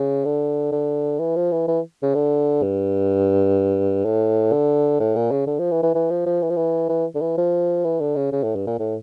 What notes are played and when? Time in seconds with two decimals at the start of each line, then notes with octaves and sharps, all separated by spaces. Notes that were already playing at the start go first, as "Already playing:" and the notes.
Already playing: C#3
0.25 D3
0.72 D3
1.20 E3
1.36 F3
1.52 E3
1.68 E3
2.03 C#3
2.15 D3
2.62 G2
4.05 A2
4.52 D3
5.00 A2
5.16 A#2
5.31 C#3
5.47 D3
5.59 F3
5.71 E3
5.83 E3
5.95 E3
6.10 F3
6.26 F3
6.42 E3
6.50 F3
6.56 E3
6.89 E3
7.15 D3
7.21 E3
7.38 F3
7.84 E3
8.00 D3
8.16 C#3
8.32 C#3
8.44 A2
8.56 G2
8.67 A#2
8.79 A2